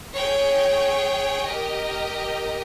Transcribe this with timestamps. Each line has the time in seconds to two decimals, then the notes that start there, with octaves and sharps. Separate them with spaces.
0.16 G#4 C#5 G5
1.46 G4 A#4 D#5 G5